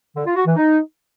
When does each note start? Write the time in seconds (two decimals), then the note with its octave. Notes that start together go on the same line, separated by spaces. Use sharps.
0.16 D3
0.26 F4
0.36 F#4
0.46 E3
0.56 D#4